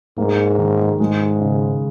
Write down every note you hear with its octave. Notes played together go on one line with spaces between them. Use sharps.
G#2 A#3
D#3
G#2 G#3
C#3